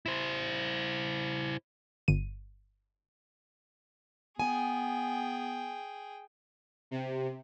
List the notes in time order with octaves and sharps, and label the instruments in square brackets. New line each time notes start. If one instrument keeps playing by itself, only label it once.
[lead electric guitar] E4 C5
[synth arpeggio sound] G1 D#7
[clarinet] B3 [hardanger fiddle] G#4 G5 [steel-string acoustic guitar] G#5
[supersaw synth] C3